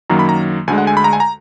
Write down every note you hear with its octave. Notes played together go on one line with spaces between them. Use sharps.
F#2 D#3 F#3 A#3 A#5
B5
A#5
D2 D3 G#3 G#5
F#5
G#5
B5
A#5
G#5
A#5